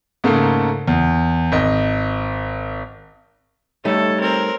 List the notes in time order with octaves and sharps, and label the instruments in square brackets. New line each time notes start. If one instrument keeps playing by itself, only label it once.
[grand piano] G#2 C#3 A3 A#3
E2
G#1 D#5
[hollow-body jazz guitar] G3 A3 D#4 [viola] A4 [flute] C#5
[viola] C4 A#4